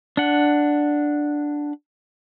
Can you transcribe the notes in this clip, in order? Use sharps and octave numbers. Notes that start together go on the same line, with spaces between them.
D4 F#5